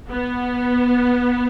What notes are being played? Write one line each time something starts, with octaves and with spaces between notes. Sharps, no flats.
B3